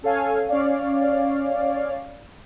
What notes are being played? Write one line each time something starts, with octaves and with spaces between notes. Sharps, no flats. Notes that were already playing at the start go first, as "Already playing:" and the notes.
C#4 A4 C#5 F5 G#5
C#4 C#5 D5 F5